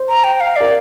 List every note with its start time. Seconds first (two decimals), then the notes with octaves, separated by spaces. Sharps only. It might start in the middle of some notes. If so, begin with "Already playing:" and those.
Already playing: C5
0.09 A#5
0.24 G5
0.40 F5
0.56 A#4 D5